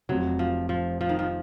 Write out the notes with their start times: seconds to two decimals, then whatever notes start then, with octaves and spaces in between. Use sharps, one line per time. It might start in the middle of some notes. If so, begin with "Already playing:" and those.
0.09 F1 F2 C3 F#3
0.39 F3
0.69 F3
1.01 F3
1.09 D#3
1.19 F3